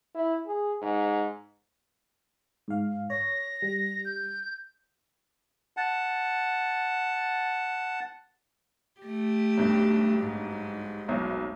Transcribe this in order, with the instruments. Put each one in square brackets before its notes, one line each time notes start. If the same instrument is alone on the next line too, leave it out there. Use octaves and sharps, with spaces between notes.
[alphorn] E4
G#4
G#2
[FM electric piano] G#2 F5
[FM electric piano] C#5 [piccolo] A#6
[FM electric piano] G3
[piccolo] G6
[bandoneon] F#5 A5
[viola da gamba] A3 G4
[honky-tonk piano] B1 G2
[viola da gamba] G#2
[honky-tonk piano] F1 B1 F#3